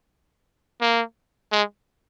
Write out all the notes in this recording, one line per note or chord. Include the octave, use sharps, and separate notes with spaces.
A#3
G#3